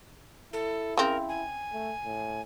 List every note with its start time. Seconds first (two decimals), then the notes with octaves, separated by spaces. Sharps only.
0.53 E4 A4
0.97 C#3 C4 A#4
1.29 G#5
1.73 A3
2.05 A2